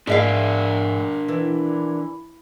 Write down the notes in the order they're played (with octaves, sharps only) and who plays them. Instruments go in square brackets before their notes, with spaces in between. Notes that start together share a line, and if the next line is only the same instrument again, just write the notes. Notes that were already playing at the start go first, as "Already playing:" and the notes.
[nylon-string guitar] G#2 E5 F5 [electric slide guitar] D4 A#4 D5
[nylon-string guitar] E3